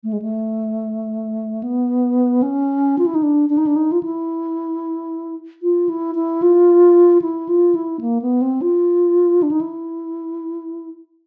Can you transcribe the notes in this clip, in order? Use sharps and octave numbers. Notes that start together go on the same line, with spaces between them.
A3
G#3
A3
B3
C#4
F4
E4
D#4
D4
D4
D#4
D4
D#4
F4
E4
F4
E4
E4
F4
E4
F4
E4
A#3
B3
C4
F4
D4
D#4
E4